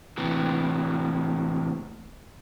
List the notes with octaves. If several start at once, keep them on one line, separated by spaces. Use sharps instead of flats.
A2 C3 E3